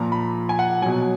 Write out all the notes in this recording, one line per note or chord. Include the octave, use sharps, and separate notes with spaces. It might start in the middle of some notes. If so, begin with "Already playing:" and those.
Already playing: A#2 F3 A#5
B5
G#5
F#5
B2 F#3 G#5